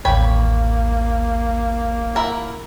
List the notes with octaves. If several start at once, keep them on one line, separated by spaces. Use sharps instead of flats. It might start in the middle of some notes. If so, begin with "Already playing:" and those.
A1 D#2 A#3 C#5 G5 B5
E4 A#4 F#5